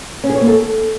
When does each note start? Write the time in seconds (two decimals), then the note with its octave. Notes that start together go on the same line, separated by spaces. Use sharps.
0.24 C#4
0.29 G#4
0.35 C#5
0.41 A#3
0.47 A4